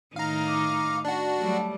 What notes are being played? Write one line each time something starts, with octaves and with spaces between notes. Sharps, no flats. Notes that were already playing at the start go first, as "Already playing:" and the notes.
A2 D#3 D#4 F5 A#5
D6
D4 F#4 A5
F#3 G3 A3